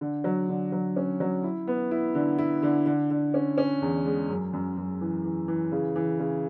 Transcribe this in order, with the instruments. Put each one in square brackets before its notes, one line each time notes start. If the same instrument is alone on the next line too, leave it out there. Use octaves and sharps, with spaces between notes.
[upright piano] D3
F#3
D3
F#3
C#4
F#3
E4
B3
E4
D3
E4
D3
D3
D3
C#4
C#4
E2
G#3
F#2
F#2
F#2
E3
E3
E3
C#3
E3
C#3